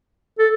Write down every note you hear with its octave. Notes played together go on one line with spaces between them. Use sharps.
A4